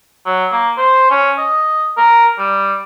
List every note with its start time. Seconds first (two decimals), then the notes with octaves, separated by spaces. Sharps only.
0.26 F#3
0.52 A#3
0.78 C5
1.11 C#4
1.38 D#5
1.97 A#4
2.38 G3